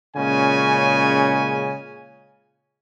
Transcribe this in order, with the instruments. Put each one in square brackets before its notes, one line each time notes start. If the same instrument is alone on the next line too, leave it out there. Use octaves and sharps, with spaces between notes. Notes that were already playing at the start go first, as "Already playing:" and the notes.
[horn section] A#2 C#3 G#3 C#4 G#5